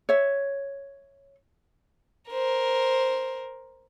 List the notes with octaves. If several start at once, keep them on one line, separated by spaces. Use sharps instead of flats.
C#5 E5
A#4 C5